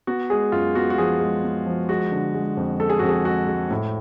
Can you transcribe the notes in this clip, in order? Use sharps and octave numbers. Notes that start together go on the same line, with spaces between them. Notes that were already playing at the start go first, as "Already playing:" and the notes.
B3 F#4
G#3 G#4
F#2 F4
B3 F#4
F#4
F3 G#4
G#3
B3
F3
G#3 F#4
D3
G#3
F2
G#3 A4
G#4
F2 F#4
G#4
G#3 F#4
G#3
A2